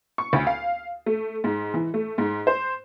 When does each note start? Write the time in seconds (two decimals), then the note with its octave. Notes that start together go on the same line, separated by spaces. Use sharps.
0.18 C#6
0.33 D2
0.47 F5
1.06 A3
1.44 G#2
1.74 E3
1.94 A3
2.18 G#2
2.47 C5